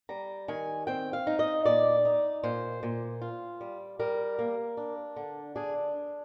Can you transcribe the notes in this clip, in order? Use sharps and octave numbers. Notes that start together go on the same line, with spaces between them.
G3 A#5
D#3 G#5
C4 G5
F5
D#4
D#5
A#2 D5
D#4
A#2 C5
A#2
F4
G3
G3 A#4
A#3
D4
D3
D4 G#4